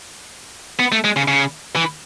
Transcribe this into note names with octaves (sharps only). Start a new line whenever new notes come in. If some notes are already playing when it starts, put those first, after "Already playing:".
B3
A3
G#3
C#3
C#3
E3